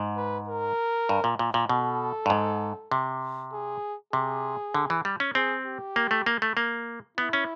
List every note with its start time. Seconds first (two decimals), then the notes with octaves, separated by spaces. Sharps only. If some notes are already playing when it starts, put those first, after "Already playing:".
Already playing: G#2
0.17 B4
0.48 A#4
1.09 G2
1.24 A#2
1.39 A#2
1.54 A#2
1.69 B2 A4
2.26 G2
2.30 G#2
2.91 C3
3.53 G#4
4.13 C3 G#4
4.74 D3
4.90 E3
5.05 G3
5.20 C#4
5.35 C4 G#4
5.65 G4
5.96 A#3
6.11 A3
6.26 A#3
6.42 A3
6.57 A#3
7.17 B3 E4
7.33 C#4